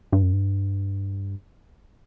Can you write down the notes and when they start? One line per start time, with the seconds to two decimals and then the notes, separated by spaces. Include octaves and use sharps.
0.12 G2
0.23 F#2
0.33 G2